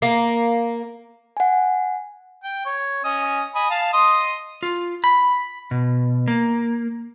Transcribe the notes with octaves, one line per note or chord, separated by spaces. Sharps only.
A#3
F#5 G#5
G5
C#5
C#4 D#5 G#5
D#5 G#5 B5
F5 A5
D#5 C6 D#6
F4
B5
B2
A#3